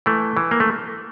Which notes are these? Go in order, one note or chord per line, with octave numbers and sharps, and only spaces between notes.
E3 A3
E3
A#3
A3